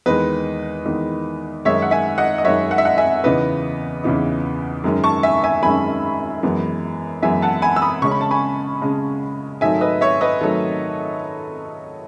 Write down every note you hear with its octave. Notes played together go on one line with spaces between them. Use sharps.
E2 D#3 G#3 B4 D#5
E2 D#3 G#3
F#2 D#3 G#3 D#4 C#5 E5
F#5
E5 G#5
D#5 F#5
D#5
F#2 D#3 G#3 D#4 C#5 E5
F#5
E5
D#5 F#5
E5 G#5
E2 C#3 E3 B3 D#4 B4 D#5
E2 C#3 E3 B3 D#4
F#2 D#3 G#3 C#4
A5 C#6
E5 G#5
E5 G#5
F#2 D#3 G#3 C#4 G#5 B5
F#2 E3 G#3 B3
F#2 E3 G#3 B3 E5 G#5
F#5 A5
G#5 B5
E6
B5 D#6
C#3 G#3 C#4 C#6
B5
A5
G#5 B5
C#3 G#3 C#4
G#2 D#3 F#3 A3 D#4 E5 G#5
B4 D#5
C#5 E5
B4 D#5
D#3 F#3 A3 D#4 A4